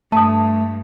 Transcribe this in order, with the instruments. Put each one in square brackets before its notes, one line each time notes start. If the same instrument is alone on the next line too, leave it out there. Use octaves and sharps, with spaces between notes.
[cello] G2 [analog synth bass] A3 [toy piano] A5 D#6